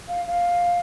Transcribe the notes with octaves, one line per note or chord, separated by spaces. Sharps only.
F5
F5